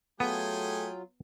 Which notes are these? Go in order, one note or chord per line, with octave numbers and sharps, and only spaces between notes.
F#3 A3 B3 F4 G#4 G5 G#5